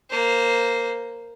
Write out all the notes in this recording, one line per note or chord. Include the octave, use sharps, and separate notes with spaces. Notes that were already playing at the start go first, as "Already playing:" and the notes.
A#3 C5